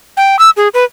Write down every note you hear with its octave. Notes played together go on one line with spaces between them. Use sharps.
G5
E6
G#4
B4